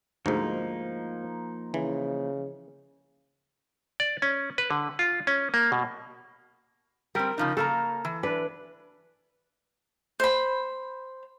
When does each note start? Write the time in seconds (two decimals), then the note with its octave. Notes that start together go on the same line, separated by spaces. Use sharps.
0.26 D2 G#2 F3 A#3 D#4
1.74 C#3 E3
4.00 D5
4.22 C#4
4.58 B4
4.71 D3
4.99 F4
5.27 C#4
5.54 A#3
5.72 B2
7.15 G3 C4 A#4
7.38 C#3 F3 D#4
7.57 C#3 A#3 A4 A#5
8.05 E3
8.23 D4 B4
10.20 C5 B5